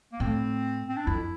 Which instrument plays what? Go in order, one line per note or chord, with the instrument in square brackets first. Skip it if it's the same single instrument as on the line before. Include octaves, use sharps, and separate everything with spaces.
[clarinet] A#3
[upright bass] A2 [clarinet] C4
[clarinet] C4
D4
[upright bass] F2 [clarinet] E4